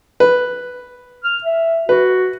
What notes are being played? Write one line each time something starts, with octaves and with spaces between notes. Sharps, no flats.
B4
F6
E5
F#4 B4